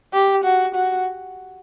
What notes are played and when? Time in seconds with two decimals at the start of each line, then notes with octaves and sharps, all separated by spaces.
0.13 G4
0.44 F#4
0.75 F#4